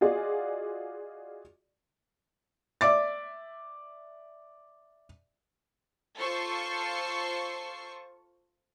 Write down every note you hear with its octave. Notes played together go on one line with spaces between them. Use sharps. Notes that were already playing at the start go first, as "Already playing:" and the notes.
F4 F#4 G#4 D5 D#5
D5 E5 D6 A6
F4 A4 C5 C#6 C7